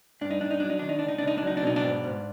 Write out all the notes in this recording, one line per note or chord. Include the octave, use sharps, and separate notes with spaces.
G2 D4
D#4
G2 D4
D#4
F#3 D4
D#4
D#3 D4
D#4
C#2 D4
D#4
D4
C#2 D#4
D4
F#3 D#4
D4
B2 D#4
D4
G#2
G#2